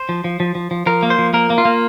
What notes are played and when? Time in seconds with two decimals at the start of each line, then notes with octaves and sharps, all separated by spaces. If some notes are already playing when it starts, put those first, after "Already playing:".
Already playing: C5
0.09 F3
0.24 F3
0.40 F3
0.55 F3
0.71 F3
0.86 F3 A#4
1.03 A#3
1.10 C5
1.19 F3
1.34 A#3 A#4
1.50 A#3
1.58 F4
1.65 A#3